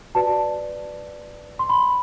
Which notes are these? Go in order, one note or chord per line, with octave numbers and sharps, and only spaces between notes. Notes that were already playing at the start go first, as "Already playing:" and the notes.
F#4 B4 D5 A5
C6
B5